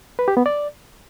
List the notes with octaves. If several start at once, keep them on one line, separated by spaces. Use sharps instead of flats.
B4
G4
B3
D5